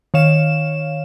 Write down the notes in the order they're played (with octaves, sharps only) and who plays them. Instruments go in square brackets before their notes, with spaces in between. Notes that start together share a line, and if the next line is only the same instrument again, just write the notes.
[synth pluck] D#3 C#5 F5 E7